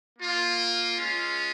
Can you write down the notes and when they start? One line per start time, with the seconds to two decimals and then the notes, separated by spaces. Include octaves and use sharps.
0.18 A#3 F4
0.96 G#3 C#4 F4